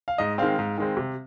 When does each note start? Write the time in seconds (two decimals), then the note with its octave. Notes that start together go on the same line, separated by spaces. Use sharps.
0.08 F5
0.18 G#2 D#5
0.38 D#3 G#3 C4 F5
0.59 G#2
0.78 D#3 G#3 C4
0.97 C3